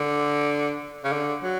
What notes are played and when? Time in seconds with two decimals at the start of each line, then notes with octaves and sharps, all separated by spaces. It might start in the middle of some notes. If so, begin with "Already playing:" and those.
Already playing: D3
1.04 C#3
1.12 D3
1.43 F#3